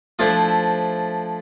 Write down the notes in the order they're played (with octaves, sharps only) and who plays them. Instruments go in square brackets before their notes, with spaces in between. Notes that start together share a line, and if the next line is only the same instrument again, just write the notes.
[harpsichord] F3 A3 D4 E4 C5